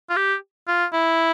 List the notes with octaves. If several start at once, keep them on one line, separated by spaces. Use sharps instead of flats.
F4
G4
F4
E4